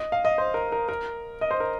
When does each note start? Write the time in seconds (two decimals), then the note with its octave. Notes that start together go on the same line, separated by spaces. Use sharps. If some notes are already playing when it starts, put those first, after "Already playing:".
Already playing: D#5
0.12 F5
0.25 D#5
0.38 C5
0.54 A#4
0.72 A#4
0.89 A#4
1.41 D#5
1.51 C5
1.60 A#4